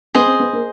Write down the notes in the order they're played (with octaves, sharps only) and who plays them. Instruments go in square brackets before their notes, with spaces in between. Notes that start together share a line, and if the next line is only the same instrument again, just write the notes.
[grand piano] B3 [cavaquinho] G#4 C5 D#5
[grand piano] C4
B3
A#3